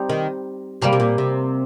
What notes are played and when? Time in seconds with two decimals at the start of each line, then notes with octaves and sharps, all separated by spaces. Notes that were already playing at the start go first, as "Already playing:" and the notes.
Already playing: G3 C4 D#4
0.09 D#3
0.82 C3 G3 A#3 G4 A#4
0.93 C3
1.00 A#2
1.18 C3